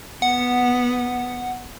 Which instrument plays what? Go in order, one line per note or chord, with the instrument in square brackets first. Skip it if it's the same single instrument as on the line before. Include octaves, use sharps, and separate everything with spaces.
[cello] B3 [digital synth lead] F#5